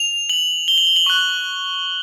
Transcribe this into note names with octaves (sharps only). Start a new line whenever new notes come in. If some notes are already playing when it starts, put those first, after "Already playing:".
Already playing: F7
F#7
G7
F#7
G7
F#7
C#6 F#6